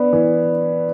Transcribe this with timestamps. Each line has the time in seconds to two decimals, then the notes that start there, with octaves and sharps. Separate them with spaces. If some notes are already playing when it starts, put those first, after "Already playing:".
Already playing: B3 B4 D5
0.13 E3